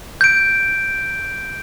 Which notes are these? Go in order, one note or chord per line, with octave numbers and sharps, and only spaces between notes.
G6 D7